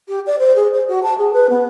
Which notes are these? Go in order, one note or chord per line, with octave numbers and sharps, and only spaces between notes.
G4
D5
C5
G#4
C5
F#4
A5
G#4
B4
B3